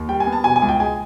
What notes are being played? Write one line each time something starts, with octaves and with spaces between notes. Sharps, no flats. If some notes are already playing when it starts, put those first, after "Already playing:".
Already playing: D#2
G3 G5
G#5
B3
A5
B2 G#5
G#5
C#2
G5
G#3 G#5